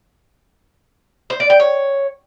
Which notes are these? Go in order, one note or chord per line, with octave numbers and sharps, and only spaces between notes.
C5
D5
G5
C#5